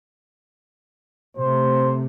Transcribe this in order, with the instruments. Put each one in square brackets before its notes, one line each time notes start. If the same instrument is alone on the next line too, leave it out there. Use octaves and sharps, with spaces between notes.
[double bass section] C3 A3 [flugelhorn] C5